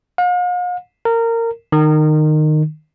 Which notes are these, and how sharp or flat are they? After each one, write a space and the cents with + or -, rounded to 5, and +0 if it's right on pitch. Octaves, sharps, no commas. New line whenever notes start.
F5 +45
A#4 -20
D#3 -20